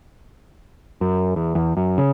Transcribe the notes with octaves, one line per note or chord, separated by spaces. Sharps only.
F#2
E2
E2
F#2
C#3